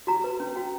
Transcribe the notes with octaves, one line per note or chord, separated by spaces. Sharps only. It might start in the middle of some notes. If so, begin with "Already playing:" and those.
F#4 A#5
B4
C#4
F#4 G5